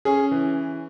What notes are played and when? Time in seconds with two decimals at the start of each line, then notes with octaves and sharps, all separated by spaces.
0.05 C#4 G#4
0.31 E3